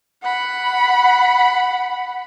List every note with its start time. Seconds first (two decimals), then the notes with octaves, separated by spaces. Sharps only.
0.23 F#5 B5